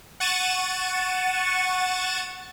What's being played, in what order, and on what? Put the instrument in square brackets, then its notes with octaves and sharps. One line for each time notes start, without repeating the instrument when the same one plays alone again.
[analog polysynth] F#5 C#6 A6 D#7 E7